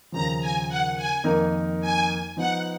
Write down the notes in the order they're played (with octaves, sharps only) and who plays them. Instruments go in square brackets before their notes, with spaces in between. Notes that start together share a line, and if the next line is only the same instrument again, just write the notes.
[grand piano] D#2 C#3 F3 [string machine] A#5
[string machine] G#5
F#5
G#5
[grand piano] F2 D#3 A#3 D#4 A#4
[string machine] G#5
[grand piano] F3 B3 D#4 [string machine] F#5